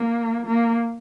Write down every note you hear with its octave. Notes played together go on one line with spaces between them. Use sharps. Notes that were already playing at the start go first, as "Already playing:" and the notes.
Already playing: A#3
A#3